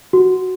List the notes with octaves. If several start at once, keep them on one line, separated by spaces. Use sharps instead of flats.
F#4